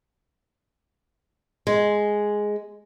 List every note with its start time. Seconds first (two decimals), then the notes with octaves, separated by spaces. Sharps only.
1.67 G#3